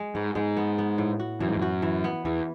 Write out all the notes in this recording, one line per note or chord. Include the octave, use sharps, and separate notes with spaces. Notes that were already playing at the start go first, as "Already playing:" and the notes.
Already playing: G#3
G#2 B3
G#2 G#3
B3
B3
A2
F#4
F#2 E3
G#2
F#2
F#4
E3
B3
E2 E3